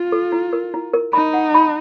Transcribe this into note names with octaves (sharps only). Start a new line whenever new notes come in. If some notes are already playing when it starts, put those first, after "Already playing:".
Already playing: F4
A4
E4
A#4
E4
A#4
D#4 B5
F#5
B5